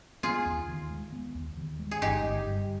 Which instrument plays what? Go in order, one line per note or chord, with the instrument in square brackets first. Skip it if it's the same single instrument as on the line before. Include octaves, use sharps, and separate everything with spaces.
[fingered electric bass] B3 [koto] F4 G#4
[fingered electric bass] D#2
D#3
G#3
B3
D#2
D#3
G#3
[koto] G#4
[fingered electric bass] G1 [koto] D#4 G4
[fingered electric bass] G1
G2